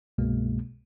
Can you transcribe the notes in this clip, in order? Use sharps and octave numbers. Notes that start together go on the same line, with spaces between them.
C2 G2 B2 G#3 A#3